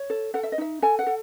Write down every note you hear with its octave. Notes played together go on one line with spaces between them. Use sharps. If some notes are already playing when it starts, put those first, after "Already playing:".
Already playing: C#5
A4
A4 F#5
E5
D#5
D#4 E5
A4 G#5
F#5
A4